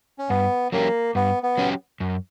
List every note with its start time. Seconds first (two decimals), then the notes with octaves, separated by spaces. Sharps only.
0.18 C#4
0.29 G2 B3
0.72 F#3 A#3 C#4 G4
1.15 G2 B3
1.43 B3
1.58 F#3 C#4 G4
2.00 F#2